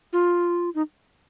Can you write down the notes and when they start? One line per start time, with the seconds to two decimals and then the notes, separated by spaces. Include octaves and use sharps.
0.13 F4
0.75 D#4